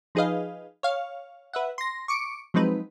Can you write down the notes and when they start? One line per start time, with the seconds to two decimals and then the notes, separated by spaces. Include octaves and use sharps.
0.15 F3 D#4 G#4 B4 D#5 F5
0.83 C#5 F5
1.53 B4 E5 F#5
1.78 C6 A#6
2.08 C#6 D6 C#7 D7
2.54 F3 F#3 G#3 C4 D#4 B4